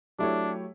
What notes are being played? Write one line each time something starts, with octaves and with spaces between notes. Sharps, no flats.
F#3 A3 D4 E4 G4 C#5